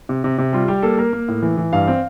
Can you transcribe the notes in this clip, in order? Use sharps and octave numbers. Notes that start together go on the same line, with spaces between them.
C3
C3
C3
G3 F4
G3 G4
A#3 A4
A#3 A#4
A#3
A2
E3
E3
G2 F5
C4